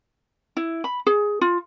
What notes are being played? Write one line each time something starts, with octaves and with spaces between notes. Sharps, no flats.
E4
B5
G#4
F4